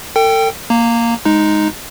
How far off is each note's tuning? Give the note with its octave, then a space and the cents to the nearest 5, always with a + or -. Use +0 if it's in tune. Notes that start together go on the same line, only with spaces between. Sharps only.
A4 +40 G5 +0
A#3 +0 A#5 -20
G#3 +0 D#4 +0